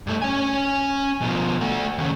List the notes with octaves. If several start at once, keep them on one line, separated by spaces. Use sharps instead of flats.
G2 A3
C#4 G#5
B2 F3
A3 F#4
D#2 C#3